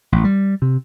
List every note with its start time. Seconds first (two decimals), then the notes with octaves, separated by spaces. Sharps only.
0.12 A1
0.24 G3
0.62 C3